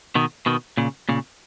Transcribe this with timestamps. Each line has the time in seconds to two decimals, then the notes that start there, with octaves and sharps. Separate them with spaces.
0.15 B2 D#3
0.46 B2 D#3
0.77 A#2 C#3
1.09 A#2 C#3